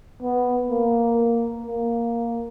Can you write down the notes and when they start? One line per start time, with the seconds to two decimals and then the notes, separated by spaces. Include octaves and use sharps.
0.22 B3
0.71 A#3
1.66 A#3